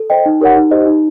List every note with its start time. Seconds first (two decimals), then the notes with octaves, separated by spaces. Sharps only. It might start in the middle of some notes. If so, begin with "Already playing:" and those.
Already playing: A4
0.10 C5 D#5 G5
0.26 D#4
0.41 G4 A#4 C#5 F#5
0.56 D#4
0.71 G4 C5 D#5
0.86 D#4